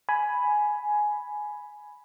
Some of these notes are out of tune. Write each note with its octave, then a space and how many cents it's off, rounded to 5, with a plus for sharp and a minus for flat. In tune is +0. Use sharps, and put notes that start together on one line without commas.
G#5 +10 B5 +0